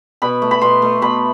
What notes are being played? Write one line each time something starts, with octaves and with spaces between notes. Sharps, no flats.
B2 B5
A3
B5
B2 C6
A3
B2 B5